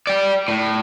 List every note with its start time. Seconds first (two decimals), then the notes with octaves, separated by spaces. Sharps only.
0.07 D5 G5
0.48 A2